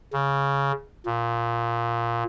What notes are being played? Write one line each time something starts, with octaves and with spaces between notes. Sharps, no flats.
C#3
A#2